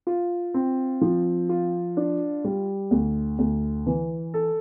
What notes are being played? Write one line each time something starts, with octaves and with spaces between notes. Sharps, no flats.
F4
C4
F3
F4
D4
G3
D2
D2
E3
A4